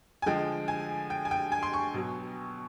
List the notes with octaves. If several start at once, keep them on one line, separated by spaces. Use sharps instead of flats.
G#5
D3 F3 G#3 G5
G#5
G5
G#5
G5
G#5
C6
C#6
B2 F#3